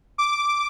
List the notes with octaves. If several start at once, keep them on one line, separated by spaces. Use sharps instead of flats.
D6